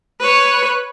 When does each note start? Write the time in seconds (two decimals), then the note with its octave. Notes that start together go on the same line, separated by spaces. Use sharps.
0.20 B4 C#5